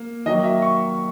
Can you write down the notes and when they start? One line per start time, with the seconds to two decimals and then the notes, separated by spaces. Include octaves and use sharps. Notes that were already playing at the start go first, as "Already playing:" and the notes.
Already playing: A#3
0.26 D#3 F#3 A#3 D#5
0.44 E5
0.62 C#6